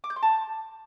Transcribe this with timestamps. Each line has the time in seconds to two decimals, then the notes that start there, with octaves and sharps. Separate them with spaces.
0.04 D6
0.10 G6
0.16 C6
0.23 A5